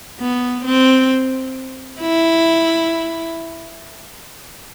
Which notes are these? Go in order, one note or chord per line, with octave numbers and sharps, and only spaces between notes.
B3
C4
E4